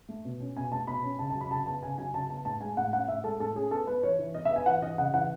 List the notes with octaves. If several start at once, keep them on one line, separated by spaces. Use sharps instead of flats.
A3
B2
C#4
B2 G#5
A3 A5
B2 B5
C#4
C#3 A5
A5
F#3
B5
C#3 A5
B3 A5
C#3 G#5
F#3 G#5
C#3 A5
B3 A5
A2 A5
G#3 G#5
A2 F#5
C#4 F#5
A2 E5
G#3 A4
A2 A4
C#4 G#4
B3 A4
B3 B4
E3 C#5
E3
B3 D#5
E5
B3
G#5
E3 F#5
E3 D#5
C#3 F#5
E3 F#5